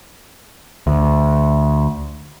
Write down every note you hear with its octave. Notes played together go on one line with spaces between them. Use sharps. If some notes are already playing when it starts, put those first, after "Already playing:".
D2